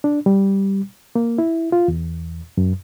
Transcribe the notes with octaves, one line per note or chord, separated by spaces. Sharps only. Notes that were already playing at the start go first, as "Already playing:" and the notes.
D4
G3
A#3
E4
F4
E2
F#2